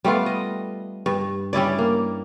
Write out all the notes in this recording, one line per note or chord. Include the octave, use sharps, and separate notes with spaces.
G3 A3 B3 F4
D#5
G2
G3 C#4 E4 D5
A#3